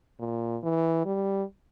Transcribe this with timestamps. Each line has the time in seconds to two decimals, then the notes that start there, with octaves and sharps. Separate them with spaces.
0.19 A#2
0.63 E3
1.05 G3